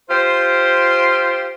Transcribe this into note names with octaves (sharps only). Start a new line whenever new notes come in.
F4 G4 C5